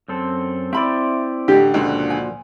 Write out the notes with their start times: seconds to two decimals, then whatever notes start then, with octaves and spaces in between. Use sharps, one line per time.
0.08 F#2 C4 A4
0.73 C4 E4 D5 E5 B5
1.48 A1 D3 G4
1.74 C#2 A#2 D3 F3 F#4
2.10 G#5